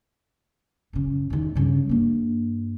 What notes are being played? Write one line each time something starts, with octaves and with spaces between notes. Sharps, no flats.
F#2 C#3
E2 D#3
G2 C#3
G2 A#3